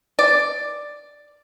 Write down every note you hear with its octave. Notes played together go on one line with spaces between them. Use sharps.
D5